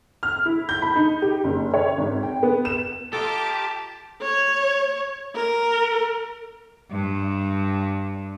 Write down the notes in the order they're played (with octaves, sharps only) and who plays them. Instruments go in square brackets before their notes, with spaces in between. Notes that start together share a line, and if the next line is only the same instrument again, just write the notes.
[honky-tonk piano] F6
E4
G6
B5
D#4
G4
F#1
C#5
G#1
G5
B3
E7
[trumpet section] F4 A#5 D6 [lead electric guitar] G4 [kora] A4 D#5 [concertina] A5
[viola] C#5
A#4
[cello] G2